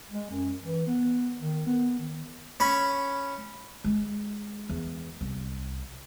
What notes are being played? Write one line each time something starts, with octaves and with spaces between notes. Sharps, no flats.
G#3
F#2
E3
B3
D#3
B3
D#3
C#4 B5
G#3
E2
C2